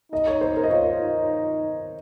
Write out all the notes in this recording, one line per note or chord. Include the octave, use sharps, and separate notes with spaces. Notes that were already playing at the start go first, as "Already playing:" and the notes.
D#4 D#5
C#5
C5
A#4
D#5
F4 C#5
D#4